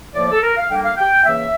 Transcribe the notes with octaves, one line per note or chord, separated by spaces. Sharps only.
A2 F3 A#3 D5
A4
A#4
F5
D3 G3 A#3 G5
F5
G5
C#3 E3 A#3 E5